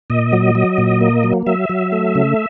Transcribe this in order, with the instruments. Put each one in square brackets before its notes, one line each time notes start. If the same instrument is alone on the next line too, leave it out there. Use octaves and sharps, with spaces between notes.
[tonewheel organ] A#2 D#5
F#3
F#3
A#2
A#3
F#3
F#3 E5
F#3
A3
C#3